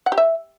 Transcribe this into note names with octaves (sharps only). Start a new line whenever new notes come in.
F#5
G4
E5